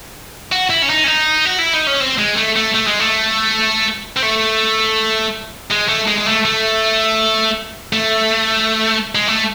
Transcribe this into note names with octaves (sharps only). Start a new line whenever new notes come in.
F#4
E4
C#4
D#4
C#4
D#4
F#4
E4
D#4
C#4
C4
G#3
A3
A3
A3
G#3
A3
C4
A3
G#3
A3
G#3
G#3
A3
A3
A3
G#3
A3